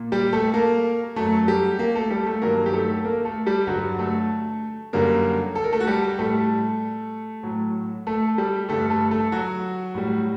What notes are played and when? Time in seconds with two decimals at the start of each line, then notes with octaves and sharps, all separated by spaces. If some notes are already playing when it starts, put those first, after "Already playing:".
Already playing: A#2
0.12 G3 G4
0.33 A3 A4
0.54 A#3 A#4
1.16 F#2 F#3 A3 A4
1.48 G3 G4
1.79 A#3 A#4
1.95 A3 A4
2.10 G3 G4
2.26 A3 A4
2.42 G2 D#3 F#3 A#3 A#4
2.66 G4
2.73 A3 A4
3.05 A#3 A#4
3.25 A3 A4
3.46 G3 G4
3.67 G2 D3 F#3 F#4
3.99 A3 A4
4.93 F#2 D3 G3 A#3 A#4
5.55 A4
5.64 A#4
5.73 A3 A4
5.80 F#4
5.87 G3 G4
6.18 A2 G3 A3 A4
7.43 A2 F#3
8.07 A3 A4
8.38 G3 G4
8.69 G2 D3 G3 A3 A4
8.90 A3 A4
9.11 A3 A4
9.32 F#3 F#4
9.94 A2 G3